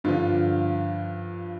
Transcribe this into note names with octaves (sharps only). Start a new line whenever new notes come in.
G2 D3 F3 F4